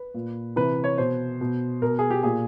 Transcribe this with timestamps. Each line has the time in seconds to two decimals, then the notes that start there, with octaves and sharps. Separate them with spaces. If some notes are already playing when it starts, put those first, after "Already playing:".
Already playing: B4
0.14 A#2
0.56 C3 E3 B4
0.84 C#5
0.98 B2 C5
1.41 B2
1.82 B2 A#4
1.99 G#4
2.10 G4
2.23 A#2 G#4